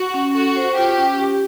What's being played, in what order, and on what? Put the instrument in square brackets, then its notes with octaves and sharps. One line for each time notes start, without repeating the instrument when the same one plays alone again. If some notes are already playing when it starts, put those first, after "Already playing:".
Already playing: [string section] F#4
[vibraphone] C#4
[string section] F#4 [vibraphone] A4
[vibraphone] C5
[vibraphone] F4 [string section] G4
[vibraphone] C#4
G4